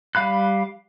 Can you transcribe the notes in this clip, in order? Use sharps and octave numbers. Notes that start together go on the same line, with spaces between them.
G3 F5 B5 F#6